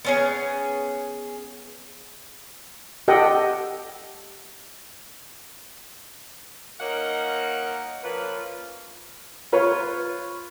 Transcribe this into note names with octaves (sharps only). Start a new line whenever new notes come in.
B3 C#4 G#4
G4 A4 D#5 F#5 G5
A#3 C#4 D#4 F5 F#5
F3 A#3 C#4 B4
F4 B4 C#5